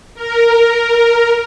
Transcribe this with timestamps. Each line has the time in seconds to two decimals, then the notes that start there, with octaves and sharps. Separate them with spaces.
0.15 A#4